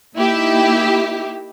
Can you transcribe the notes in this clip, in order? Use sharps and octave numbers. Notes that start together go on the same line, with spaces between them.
A#3 D#4 E4 G4 E5